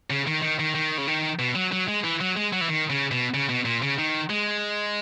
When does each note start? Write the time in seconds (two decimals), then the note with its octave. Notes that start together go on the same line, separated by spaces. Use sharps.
0.10 C#3
0.27 D#3
0.42 D#3
0.59 D#3
0.75 D#3
0.98 C#3
1.08 D#3
1.39 B2
1.55 F#3
1.72 F#3
1.88 G#3
2.04 E3
2.21 F#3
2.36 G#3
2.53 F#3
2.61 E3
2.69 D#3
2.90 C#3
3.11 B2
3.34 C#3
3.49 B2
3.65 A#2
3.82 C#3
3.98 D#3
4.30 G#3